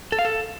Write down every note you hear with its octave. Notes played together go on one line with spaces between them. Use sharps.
A4
F5
A4